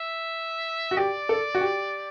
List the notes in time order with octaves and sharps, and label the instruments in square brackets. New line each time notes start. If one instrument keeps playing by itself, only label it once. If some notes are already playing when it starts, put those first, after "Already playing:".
Already playing: [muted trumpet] E5
[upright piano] F#4
[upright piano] G4 [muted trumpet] D5
[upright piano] A4
F#4
G4